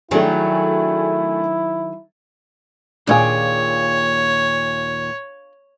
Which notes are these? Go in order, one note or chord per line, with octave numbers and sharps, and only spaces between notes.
D#3 F#3 A3 D4 E4 G#4
D#2 A#2 D4 F4 G#4 C#5